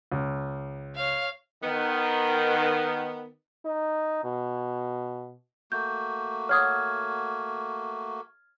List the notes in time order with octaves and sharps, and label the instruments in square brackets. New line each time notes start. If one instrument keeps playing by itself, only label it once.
[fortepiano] C#2
[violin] C#5 F5
[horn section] D#3 B3
[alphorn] D#4
B2
[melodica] A3 A#3 F#4 [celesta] G6
[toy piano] C#5 F#5 D#6 [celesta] F6 G#6